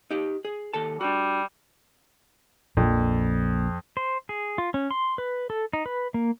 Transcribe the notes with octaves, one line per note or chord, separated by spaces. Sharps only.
D#4 G4
G#4
D#2 A4 A5
G3 D4 F#4
A#1 F2 A#2
C5
G#4
F4
C#4
C6
B4
A4
D#4
B4
A#3